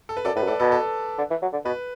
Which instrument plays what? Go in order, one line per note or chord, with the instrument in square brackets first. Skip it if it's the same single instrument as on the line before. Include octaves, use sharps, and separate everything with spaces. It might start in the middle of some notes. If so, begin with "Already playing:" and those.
[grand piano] A4
B4
[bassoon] F#2 [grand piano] A4 D5
[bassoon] A2 [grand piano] B4
[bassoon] F#2
[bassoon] A2 [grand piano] A4 D5
[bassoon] B2 [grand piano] A4
[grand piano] A4
[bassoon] D3
E3
F#3
D3
[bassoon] B2 [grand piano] B4